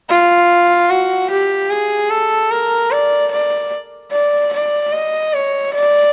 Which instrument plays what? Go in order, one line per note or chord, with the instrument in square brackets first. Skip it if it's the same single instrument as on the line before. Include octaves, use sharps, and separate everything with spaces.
[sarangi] F4
F#4
G4
G#4
A4
A#4
D5
D5
D5
D5
D#5
C#5
D5